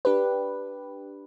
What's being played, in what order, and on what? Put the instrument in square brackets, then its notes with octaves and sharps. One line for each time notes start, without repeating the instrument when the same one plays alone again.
[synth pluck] D4 G4 B4